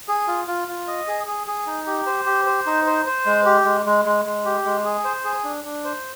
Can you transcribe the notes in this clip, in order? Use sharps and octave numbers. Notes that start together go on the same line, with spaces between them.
G#4
F4
F4
F4
D#5
G#4
G#4
G#4
D#4
G4
C5
G4
C5
D#4
C5
C5
G#3
G4
G#3
G#3
G#3
G#3
G4
G#3
G#4
C5
G#4
D4
D4
C5